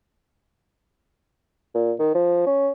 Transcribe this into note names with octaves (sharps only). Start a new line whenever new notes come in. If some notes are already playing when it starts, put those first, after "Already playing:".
A#2
D#3
F3
C#4